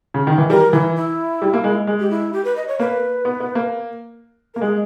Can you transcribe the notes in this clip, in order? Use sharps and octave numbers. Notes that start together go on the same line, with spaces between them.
C#3
D#3
E3
G3 A#4
E3 E4
E4
G3
A#3
G#3
G#3
G4
E4
G4
B4
D#5
C#5
A#3 B4
B3
B3
A#3
A#3 A#4
G#3 G#4